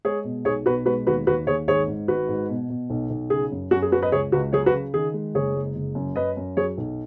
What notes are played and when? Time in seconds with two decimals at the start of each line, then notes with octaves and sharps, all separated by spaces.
0.05 G#3 G#4 C#5
0.24 B2
0.45 B1 G#4 C#5
0.66 B2 F#4 B4
0.86 G#3 F#4 B4
1.07 D#2 F#4 B4
1.27 D#2 F#4 B4
1.47 D#2 G#4 C#5
1.67 G#1 G#4 C#5
1.88 G#2
2.08 G#1 F#4 B4
2.29 G#2
2.49 B2
2.70 B2
2.90 B1
3.10 B1
3.30 C#3 G#4
3.52 F#2
3.71 F#2 F#4
3.82 G#4
3.92 F#2 F#4 B4
4.02 B4 D#5
4.12 C#2 G#4 C#5
4.32 C#2 F#4 B4
4.53 F#3 G#4 C#5
4.66 F#4 B4
4.73 C#3
4.94 D#3 G#4
5.14 G#3
5.34 F#1 G#4 C#5
5.55 G#3
5.76 F#1
5.95 F#2
6.16 F#2 B4 D#5
6.37 F#2
6.57 F#3 G#4 C#5
6.77 B1